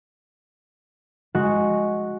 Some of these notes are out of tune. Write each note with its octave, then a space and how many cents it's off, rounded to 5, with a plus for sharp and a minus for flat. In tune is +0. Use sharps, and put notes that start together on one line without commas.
G#3 +0 F#4 -5